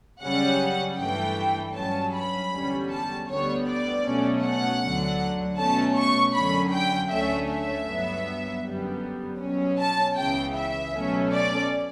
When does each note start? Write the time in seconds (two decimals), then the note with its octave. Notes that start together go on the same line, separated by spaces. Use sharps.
0.22 F#2 C#3 G3 C#4 F#5
0.98 G2 E3 A3 G5
1.75 G2 F#3 C#4 A5
2.13 B5
2.51 E2 D3 G3 C#4
2.90 A5
3.28 D2 D3 G3 B3 C#5
3.67 D5
4.04 B2 F#3 A3 C#4
4.43 F#5
4.81 D2 D3 F#3
5.58 B2 A3 C#4 A5
5.96 C#6
6.34 F#2 D3 F#3 C#4 B5
6.73 G5
7.10 D2 D3 A3 C#4 E5
7.50 E5
7.88 G2 F#3 B3
8.64 F#2 D3 G3 B3
9.41 B2 F#3 C#4
9.79 A5
10.17 C#2 C#3 E3 G5
10.55 E5
10.94 B2 F#3 A3 C#4
11.32 D5